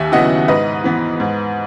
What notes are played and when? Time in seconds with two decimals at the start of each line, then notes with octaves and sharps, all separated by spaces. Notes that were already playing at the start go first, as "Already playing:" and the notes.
Already playing: D#2 E5 G#5
0.12 C#3 F#3 B3 E4 D#5 F#5
0.48 G#2 B4 D#5
0.84 E3 B3
1.20 G#2